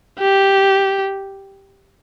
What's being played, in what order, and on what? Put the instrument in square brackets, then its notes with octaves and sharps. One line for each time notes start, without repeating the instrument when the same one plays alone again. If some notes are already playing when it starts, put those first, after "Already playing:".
[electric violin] G4